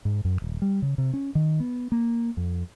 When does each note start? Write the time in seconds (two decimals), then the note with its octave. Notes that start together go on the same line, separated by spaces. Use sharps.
0.05 G#2
0.25 F#2
0.42 D#1
0.62 G3
0.82 C#3
0.98 C3
1.13 C#4
1.35 D#3
1.60 B3
1.92 A#3
2.37 F2